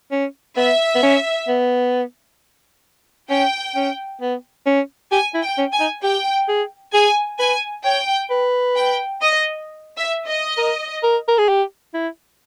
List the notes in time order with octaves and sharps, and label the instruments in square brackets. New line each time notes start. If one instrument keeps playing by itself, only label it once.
[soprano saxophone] C#4
[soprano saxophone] B3 [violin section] E5
[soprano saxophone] B3
C#4
B3
[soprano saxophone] C#4 [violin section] G5
[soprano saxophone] C#4
B3
C#4
[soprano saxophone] G4 [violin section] G#5
[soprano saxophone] E4
[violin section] G5
[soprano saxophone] C#4
[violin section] G#5
[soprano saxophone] D#4
[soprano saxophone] G4 [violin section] G5
[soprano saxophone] G#4
[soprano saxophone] G#4 [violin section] G#5
[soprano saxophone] B4 [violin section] G#5
[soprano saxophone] C#5 [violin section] G5
[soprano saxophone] B4
[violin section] G5
D#5
E5
D#5
[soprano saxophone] A#4
A#4
A#4
G#4
G4
E4